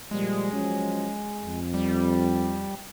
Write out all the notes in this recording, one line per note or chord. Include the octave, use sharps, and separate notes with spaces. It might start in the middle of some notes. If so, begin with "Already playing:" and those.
A#2 F3 G3 G#3
F3 F#3 C#4
F2
G3